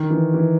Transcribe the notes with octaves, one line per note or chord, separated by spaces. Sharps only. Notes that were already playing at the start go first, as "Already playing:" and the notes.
Already playing: D#3
E3
E3